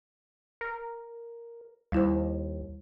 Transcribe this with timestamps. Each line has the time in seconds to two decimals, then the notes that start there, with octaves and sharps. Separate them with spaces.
0.61 A#4
1.92 D#2 G3 E4 C5